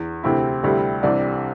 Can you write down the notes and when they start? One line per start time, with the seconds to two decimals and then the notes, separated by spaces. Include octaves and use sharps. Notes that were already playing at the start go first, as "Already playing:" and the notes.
Already playing: E2
0.24 D2 C3 E3 C4 E4
0.63 D2 C3 G3 C4 E4
1.03 C2 C3 E3 G3 D4 D5